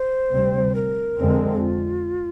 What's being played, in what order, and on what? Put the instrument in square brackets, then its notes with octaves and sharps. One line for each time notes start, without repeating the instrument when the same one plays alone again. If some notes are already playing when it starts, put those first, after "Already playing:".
Already playing: [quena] C5
[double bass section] D2 C3 G3 C4
[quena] A#4
[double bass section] F2 D3 G#3 C4
[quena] F4